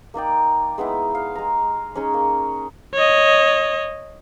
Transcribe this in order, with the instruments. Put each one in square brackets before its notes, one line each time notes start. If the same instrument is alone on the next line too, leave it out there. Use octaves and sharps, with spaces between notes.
[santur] A#3 D#4 D5 G5
G#3 B3 D#4 E4
F5
G#3 A#5
C#4 D#4 G#4 C#5
A#3
[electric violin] C#5 D#5